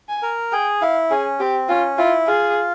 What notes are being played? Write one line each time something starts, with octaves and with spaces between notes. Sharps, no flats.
G#5
A#4
G#4 G5
E4 F5
C#4 G#4
C4 G4
C#4 F4
E4 F4
F4 G#4